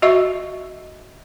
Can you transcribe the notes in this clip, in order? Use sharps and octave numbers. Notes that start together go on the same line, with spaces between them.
F#4 D#5 E5 C#6